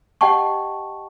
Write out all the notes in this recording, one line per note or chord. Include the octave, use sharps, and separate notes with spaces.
G4 D#5 F#5 G5 A5 C#6